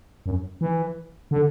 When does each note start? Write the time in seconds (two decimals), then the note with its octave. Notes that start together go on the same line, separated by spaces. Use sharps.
0.26 F#2
0.61 E3
1.31 D3